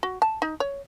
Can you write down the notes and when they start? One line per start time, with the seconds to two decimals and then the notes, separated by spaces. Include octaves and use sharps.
0.03 F#4
0.22 A5
0.42 D#4
0.60 C#5